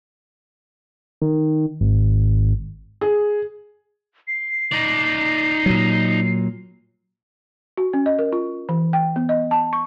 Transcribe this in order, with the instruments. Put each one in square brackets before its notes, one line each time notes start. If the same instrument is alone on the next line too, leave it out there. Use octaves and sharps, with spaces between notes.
[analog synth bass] D#3
G#1
[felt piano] G#4
[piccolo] C7
[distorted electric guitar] D#4 D5
[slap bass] A#2 F#3
[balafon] F#4
C#4
D#5
A#4
F4
E3
G5
B3
D#5
A5
C#6